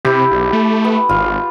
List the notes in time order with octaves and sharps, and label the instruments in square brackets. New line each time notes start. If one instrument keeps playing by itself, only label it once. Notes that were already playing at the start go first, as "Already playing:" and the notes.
[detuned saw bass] C3 [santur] E4 G4
[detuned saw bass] B1
A3
[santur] B3
[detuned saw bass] G#1 [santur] F4